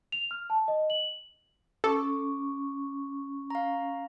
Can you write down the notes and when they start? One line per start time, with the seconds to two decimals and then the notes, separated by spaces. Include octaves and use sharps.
0.12 F7
0.31 F6
0.50 A5
0.68 D#5
0.90 F#7
1.84 C#4 A4 C#6 D6
3.50 F5 A#5